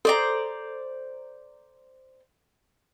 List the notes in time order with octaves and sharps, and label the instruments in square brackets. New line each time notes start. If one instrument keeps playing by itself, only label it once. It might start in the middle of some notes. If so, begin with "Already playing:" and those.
[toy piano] A4 [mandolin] C5 D5 A#5